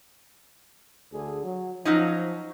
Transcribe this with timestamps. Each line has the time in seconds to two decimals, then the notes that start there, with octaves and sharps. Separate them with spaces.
1.12 D2 D3 G#4
1.44 F#3
1.85 F3 F#3 C#4 D#4